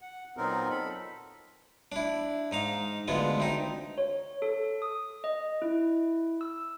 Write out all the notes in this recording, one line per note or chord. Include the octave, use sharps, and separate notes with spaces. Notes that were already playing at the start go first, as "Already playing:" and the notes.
F#5
A#2 F#3 B3 C4 D#4 A#4
A4 B5
D4 E4
G#2 D#4 F5
D2 D3 G#3 B3 F4
D2 C4 D#4
C#5
A4
D#6
D#5
E4
E6